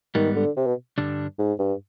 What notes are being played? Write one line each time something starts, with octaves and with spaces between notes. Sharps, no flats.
G#2 D#3 G3 B3
D3
C3
B2
G2 D3 G3 D4
G#2
G2